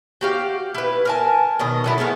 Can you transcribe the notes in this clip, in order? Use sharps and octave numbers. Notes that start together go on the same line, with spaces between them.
F#4 G4 F5
E4 B4
A#4 G#5 A5
B2 D#3 D#5
D3 F#3 E4
G#3 A3 B3 A#4